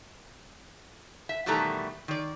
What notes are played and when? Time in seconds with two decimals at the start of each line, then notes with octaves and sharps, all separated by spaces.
1.29 E5
1.46 B2 D#3 E3 G3 A3 A#5
2.08 D#3 D5